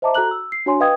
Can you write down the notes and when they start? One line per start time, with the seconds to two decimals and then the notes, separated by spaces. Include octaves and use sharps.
0.02 C5 D#5 E5 A5 A#5 D6
0.14 F#4 A4 A#5 F#6 F#7
0.31 E6
0.52 C7
0.66 D4 F#4 C#5 G#5 C6
0.80 B4 D#5 F5 G5 D#6 G#6